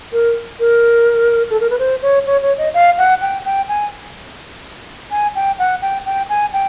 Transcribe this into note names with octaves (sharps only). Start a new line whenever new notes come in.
A#4
A#4
A4
A#4
B4
C5
C#5
C#5
C#5
D#5
F5
F#5
G5
G5
G#5
G#5
G5
F#5
G5
G5
G#5
G5